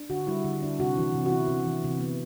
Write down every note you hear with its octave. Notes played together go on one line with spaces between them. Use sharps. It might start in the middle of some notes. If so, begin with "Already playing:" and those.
Already playing: D4
D3 F#4
G3 E4
D3
D4
C3 F#4
E3
C3
F#4
B3 E4
C3
E3
C3
B3